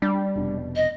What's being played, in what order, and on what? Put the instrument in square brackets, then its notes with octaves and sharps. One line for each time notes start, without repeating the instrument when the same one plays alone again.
[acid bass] G3 [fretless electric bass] D4
[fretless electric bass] F1 B2 D4
[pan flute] D#5